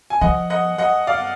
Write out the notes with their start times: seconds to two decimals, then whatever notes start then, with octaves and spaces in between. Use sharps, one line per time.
0.10 G#5
0.21 F3 D#5 F#5
0.50 D#5 F#5
0.78 D#5 F#5
1.07 D5 F5